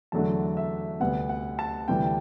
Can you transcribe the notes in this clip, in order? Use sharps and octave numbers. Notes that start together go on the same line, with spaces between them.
E2 D3 F#3 A3 D4 A5
E5
D2 C3 G3 B3 F#5
F#5
A5
D2 C3 E3 G3 G5